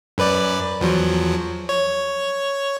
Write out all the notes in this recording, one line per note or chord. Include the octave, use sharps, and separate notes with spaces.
F#2 B4 D5
E2 F3 F#3
C#5